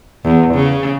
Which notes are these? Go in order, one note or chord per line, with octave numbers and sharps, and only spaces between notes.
E2
C#3